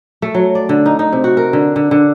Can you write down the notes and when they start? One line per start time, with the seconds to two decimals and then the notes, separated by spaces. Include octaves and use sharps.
0.22 A3
0.34 F#3
0.55 D5
0.69 D3
0.86 D#4
0.99 D#4
1.12 C3
1.24 F#4
1.37 A#4
1.53 D3
1.76 D3
1.91 D3